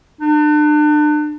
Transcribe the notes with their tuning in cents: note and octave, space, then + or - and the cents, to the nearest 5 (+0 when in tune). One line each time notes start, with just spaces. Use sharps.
D4 +35